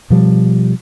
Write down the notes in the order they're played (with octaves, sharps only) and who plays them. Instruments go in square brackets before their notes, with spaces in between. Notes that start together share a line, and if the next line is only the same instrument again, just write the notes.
[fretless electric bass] B2 F3 G3